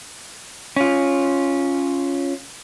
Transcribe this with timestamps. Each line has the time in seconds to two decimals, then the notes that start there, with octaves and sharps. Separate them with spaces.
0.76 C#4 F4